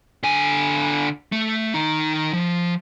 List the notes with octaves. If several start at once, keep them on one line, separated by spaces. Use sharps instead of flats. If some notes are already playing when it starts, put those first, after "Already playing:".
D3 G#5
A3
D#3 D#4
F3